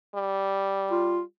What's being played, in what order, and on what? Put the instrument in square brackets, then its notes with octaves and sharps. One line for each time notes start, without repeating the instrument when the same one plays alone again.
[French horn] G3
[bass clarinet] F4